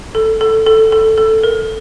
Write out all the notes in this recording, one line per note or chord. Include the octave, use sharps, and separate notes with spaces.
A4
A4
A4
A4
A4
A#4